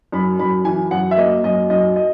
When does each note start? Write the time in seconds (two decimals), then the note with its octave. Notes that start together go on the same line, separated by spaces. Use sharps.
0.12 F#2 B5
0.39 F#2 B5
0.65 E3 G#5
0.91 F#2 F#5
1.11 E5
1.17 A#3 D#5
1.44 F#2 D#5
1.70 F#2 D#5
1.96 D#5